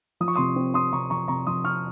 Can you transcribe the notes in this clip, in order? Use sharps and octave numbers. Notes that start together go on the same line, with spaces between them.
F3 D#6
C#6
C3 C6 D#6
C4
C4 C6 D#6
C3 A#5 C#6
F3 A#5 C#6
C3 A#5 C#6
F3 C6 D#6
C4 C#6 F6